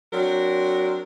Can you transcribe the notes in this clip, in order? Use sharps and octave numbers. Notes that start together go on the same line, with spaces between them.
F#3 C4 D4 A#4